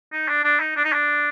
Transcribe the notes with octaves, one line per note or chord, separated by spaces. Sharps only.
D#4
D4
D4
D#4
D4
D#4
D4